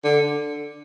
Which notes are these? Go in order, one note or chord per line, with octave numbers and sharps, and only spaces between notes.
D3